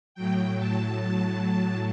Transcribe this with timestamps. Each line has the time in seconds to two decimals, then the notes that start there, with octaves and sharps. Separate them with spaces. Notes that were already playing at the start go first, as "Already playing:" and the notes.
0.15 A2 F#3 G5
0.57 A5
0.99 A5
1.40 A5